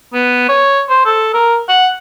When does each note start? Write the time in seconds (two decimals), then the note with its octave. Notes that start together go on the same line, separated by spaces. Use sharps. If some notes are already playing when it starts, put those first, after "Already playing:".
0.14 B3
0.49 C#5
0.89 C5
1.05 A4
1.34 A#4
1.69 F#5